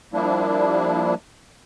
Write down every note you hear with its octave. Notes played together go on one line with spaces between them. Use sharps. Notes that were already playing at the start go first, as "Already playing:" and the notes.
F3 G3 A#3 D4 E4